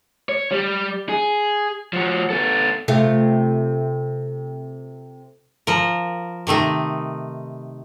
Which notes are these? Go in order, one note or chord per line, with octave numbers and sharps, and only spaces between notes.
C#5
G3
G#4
F3 F#4
B3 A4
C3 A3 F4
F3 A#4
C3 D#3 A3 D#4